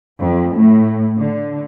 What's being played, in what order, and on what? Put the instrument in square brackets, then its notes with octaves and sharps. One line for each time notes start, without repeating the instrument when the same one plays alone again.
[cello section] F2
A2
D3